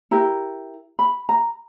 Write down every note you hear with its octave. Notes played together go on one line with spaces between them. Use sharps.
E4 G4 A#4 A#5
B5
A#5